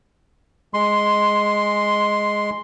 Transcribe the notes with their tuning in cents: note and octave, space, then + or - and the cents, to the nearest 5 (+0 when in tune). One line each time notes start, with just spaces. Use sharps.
G#3 +0 C6 +0